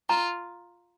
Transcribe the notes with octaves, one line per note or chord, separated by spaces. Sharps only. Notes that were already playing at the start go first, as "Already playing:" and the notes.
F4 A#5